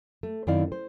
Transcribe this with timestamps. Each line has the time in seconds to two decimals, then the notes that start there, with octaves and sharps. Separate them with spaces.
0.23 A3
0.47 F#2 D#3 C4 E4 D5 F5
0.72 C5